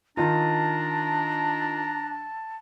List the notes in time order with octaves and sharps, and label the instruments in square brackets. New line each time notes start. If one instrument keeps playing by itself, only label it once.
[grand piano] D#3 D#4 F4 [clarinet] D4 [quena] A5 [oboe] A#5